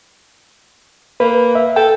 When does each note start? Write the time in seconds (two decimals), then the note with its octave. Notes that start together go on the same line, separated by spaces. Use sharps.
1.20 A#3 B4
1.55 E5
1.76 A4 G5